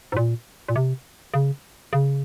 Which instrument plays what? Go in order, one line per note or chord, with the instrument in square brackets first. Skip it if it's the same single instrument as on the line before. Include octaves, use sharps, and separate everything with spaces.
[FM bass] G#2
A#2
A#2
C3
C#3
C#3